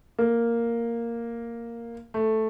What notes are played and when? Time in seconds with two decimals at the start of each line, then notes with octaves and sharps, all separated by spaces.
0.18 A#3
2.14 A3